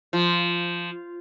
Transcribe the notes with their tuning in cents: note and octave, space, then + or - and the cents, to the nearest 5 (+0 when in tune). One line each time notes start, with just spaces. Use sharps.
F3 -10